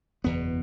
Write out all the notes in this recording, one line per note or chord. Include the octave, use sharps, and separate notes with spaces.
F#1 E2 B2 B3